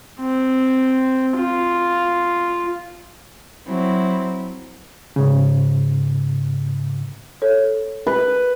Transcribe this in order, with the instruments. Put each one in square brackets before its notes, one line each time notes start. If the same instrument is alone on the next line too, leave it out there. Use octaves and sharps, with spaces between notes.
[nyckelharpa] C4
F4
[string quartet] F#3 C4 E4
[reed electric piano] G#2 C#3
[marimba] A4 C#5
[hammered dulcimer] B4